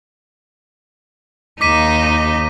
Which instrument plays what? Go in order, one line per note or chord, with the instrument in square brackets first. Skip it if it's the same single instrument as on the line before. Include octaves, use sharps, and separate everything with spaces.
[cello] D#2 D#4 [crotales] D6 B6 D#7